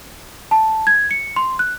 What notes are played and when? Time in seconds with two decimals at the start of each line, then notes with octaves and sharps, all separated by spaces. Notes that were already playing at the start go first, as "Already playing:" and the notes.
0.51 A5
0.87 G#6
1.11 C#7
1.36 C6
1.59 F#6